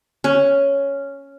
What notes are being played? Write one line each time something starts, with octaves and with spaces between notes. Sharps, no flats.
C#4